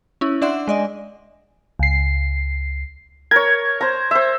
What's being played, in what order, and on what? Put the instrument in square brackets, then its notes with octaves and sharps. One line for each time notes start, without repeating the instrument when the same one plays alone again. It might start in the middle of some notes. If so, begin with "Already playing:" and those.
[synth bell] C#4 E4
D4 D5 E5 F#5 C6
G#3 D5 D#5
[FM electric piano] C#2 C7
[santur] A#4 C#5 [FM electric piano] G#6
[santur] C5 A#5
C5 E5